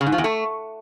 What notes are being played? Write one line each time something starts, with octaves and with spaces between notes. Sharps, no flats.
C#3
G#2
F3
E2
A3